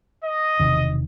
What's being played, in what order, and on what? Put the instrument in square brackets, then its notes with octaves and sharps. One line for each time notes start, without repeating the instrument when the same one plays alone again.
[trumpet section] D#5
[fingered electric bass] E1 C3 D#3